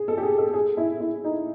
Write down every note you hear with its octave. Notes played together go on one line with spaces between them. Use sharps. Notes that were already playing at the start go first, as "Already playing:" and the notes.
Already playing: G#4
A4
G4
G#4
A4
G#4
E4
E4
D#4